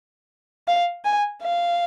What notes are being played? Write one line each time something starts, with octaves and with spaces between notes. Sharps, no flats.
F5
G#5
F5